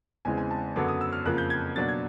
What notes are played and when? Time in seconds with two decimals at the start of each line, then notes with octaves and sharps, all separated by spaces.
0.25 E2 C#3 E3 G#3 C4 G#5
0.37 G#5
0.51 A5
0.76 F#2 D3 F#3 B3 D6
0.88 D#6
1.01 E6
1.13 F6
1.25 F2 C#3 F3 A#3 F#6
1.38 G6
1.50 G#6
1.76 B2 F#3 A#3 D4 A6
1.88 G#6